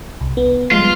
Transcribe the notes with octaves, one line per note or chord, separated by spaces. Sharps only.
C2
B3
F3 G3 G#3 F4